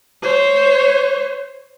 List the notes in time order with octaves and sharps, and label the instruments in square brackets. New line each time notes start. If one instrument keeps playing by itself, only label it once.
[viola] C5 C#5